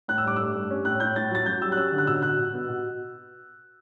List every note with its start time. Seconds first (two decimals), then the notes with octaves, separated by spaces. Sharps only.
0.08 A2 F#6
0.18 E6
0.24 G2 D6
0.36 A3 E6
0.54 G2
0.70 C#4
0.85 A2 F#6
1.00 A2 G6
1.16 A2 A6
1.31 F#3 A6
1.46 F#2 G6
1.61 G3 E6
1.72 F#6
1.76 C#4 E6
1.92 D3
1.98 F#6
2.07 B2 E6
2.22 B2 F#6
2.38 B2
2.53 B3
2.69 B2